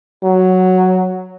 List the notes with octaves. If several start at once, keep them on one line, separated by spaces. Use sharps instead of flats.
F#3